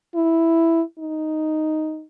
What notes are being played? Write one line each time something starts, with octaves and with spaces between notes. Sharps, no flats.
E4
D#4